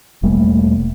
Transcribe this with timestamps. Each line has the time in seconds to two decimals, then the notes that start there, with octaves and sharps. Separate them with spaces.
0.23 E1 G3 A3 A#3